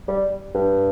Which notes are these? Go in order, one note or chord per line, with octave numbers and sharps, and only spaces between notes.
G3
G2